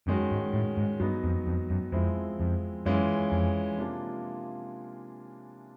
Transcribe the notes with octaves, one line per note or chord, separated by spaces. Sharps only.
F#2 D#3 G#3 C#4 F#4
G#2
A2
G#2
G2 F#3 B3 D#4
F2
F2
F#2
F2 F3 G#3 C4 E4
F2
F#2 E3 G#3 C#4 F4
F2
C3 F3 A#3 D4 F4